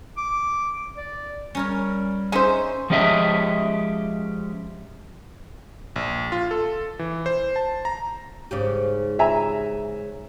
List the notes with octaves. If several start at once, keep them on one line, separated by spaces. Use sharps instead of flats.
D6
D5
G3 C#4 A#4 C#5
C#4 D#4 G#4 C5 E5
F3 G#3 C#4 G4 D#5 E5
A#1
F4
A4
E3
C5
A5
A#5
G#2 C#3 G4
E5 G#5 A#5